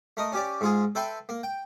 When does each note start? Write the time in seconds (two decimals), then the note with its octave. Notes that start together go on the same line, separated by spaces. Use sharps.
0.17 A3 A#4 D#5
0.32 C#4 G4 D5
0.61 G#2 F4 G#4
0.95 A4 B4 E5 G5 C6
1.29 A#3
1.43 G5